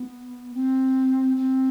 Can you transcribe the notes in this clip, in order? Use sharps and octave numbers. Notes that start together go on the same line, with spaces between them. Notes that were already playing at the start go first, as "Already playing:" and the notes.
Already playing: B3
C4
C4